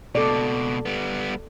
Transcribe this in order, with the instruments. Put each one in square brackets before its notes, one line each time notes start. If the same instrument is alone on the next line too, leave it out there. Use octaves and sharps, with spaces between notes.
[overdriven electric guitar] C#2 B2 [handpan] A4 D5
[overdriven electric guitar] G3 B3